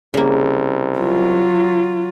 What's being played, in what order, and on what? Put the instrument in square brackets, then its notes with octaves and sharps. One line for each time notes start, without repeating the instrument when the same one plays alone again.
[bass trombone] C2 [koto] C#3 A#3
[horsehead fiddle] F#3 F4